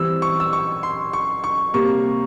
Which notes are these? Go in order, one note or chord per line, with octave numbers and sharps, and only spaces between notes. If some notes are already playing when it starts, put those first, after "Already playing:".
Already playing: E3 G3 C4 E6
C#6
E6
C#6
C6
C#6
C#6
C3 G3 A#3 C#6